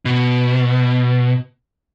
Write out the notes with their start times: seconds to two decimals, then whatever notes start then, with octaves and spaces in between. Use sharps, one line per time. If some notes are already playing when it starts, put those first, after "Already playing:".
0.05 B2